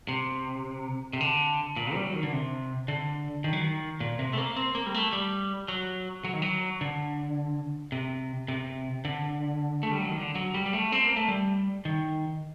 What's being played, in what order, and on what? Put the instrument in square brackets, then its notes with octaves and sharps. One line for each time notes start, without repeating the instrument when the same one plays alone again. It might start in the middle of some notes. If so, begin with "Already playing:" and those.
[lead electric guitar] C3
C3
D3
A#2
G3
F#3
D#3
D3
C3
D3
D#3
F#3
D#3
A#2
C3
A3
A#3
C4
A#3
G3
A3
G3
F#3
F#3
D#3
F#3
D3
C3
C3
D3
A3
G3
F#3
D#3
D3
F#3
G3
G3
A3
C4
A#3
A3
G3
D#3